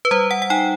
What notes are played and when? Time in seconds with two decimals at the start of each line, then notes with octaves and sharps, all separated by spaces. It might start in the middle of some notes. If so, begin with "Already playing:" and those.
0.05 B4
0.11 G3 C5
0.31 F#5
0.42 F#5
0.50 D#4 G5